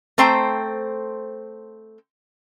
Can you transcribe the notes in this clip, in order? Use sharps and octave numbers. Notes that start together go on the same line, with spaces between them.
A3 C4 C5 G5 A#5